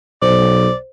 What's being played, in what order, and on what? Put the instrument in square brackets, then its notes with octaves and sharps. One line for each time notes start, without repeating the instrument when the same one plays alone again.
[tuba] B1 [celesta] C5 [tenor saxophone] D5